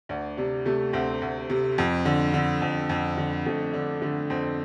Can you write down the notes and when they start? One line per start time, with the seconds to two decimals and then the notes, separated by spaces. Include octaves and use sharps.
0.09 D2 D4
0.37 C3 D4
0.66 C3 A3
0.93 D2 C4
1.22 D2
1.50 C3
1.78 F2
2.05 D3
2.34 D3
2.62 F2
2.89 F2
3.18 D3
3.46 F2 A3
3.73 D3 D4
4.02 D3 A3
4.30 F2 C4